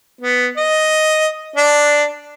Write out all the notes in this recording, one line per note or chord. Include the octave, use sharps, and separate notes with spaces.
B3
D#5
D4